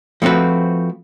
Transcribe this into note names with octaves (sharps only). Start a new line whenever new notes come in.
F3 A3 C4 F#4 B4